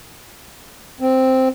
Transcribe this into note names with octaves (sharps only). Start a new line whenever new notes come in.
C4